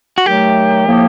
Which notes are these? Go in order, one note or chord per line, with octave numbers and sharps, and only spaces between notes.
F#4
D#3 F#3 A3 G4
A2 F3 A#3